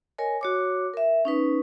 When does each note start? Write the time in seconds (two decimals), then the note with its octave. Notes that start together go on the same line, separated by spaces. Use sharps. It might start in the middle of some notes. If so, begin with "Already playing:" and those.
0.18 A#4 C#5 D#5 G#5
0.41 F#4 C#5 D6
0.94 A#4 E5
1.25 C#4 D#4 B4